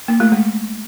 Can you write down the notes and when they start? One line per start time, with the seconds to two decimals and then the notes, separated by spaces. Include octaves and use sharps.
0.08 A#3
0.20 A3
0.32 G#3